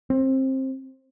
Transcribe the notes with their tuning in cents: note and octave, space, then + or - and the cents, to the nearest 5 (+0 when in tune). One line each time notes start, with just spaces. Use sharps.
C4 +20